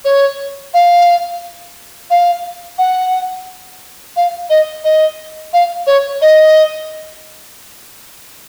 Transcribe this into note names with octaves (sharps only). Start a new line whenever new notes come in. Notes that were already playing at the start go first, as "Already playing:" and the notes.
C#5
F5
F5
F#5
F5
D#5
D#5
F5
C#5
D#5